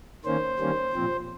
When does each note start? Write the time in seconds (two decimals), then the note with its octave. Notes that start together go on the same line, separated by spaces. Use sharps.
0.25 D#3 A#3 C#4 C5
0.59 D#3 G3 A#3 C#4
0.93 A#2 F3 C4